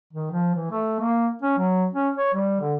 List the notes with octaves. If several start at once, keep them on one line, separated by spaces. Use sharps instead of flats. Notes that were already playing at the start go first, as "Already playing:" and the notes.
D#3
F3
E3
A3
A#3
C#4
F#3
C#4
C#5
G3
D3